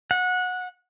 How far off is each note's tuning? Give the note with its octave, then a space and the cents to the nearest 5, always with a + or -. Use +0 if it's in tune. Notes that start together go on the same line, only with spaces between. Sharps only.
F#5 -20